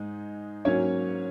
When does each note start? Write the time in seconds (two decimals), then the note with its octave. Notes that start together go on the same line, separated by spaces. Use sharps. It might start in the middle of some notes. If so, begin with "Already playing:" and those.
Already playing: G#2 G#3 D#4
0.65 G#2 F#3 A#3 C#4 C#5